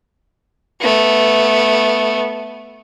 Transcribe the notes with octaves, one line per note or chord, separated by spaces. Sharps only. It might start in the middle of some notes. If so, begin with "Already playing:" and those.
A3 B3